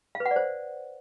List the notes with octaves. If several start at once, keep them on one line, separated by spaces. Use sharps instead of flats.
F5
B4
F#5
D5
C5